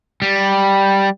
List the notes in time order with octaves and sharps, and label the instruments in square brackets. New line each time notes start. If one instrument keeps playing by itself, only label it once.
[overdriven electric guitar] G3